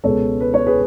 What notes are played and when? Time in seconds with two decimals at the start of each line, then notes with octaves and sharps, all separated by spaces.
0.04 C#2 B2 G#3 B3 A4 C#5
0.41 B4
0.54 C#5
0.67 G#4 B4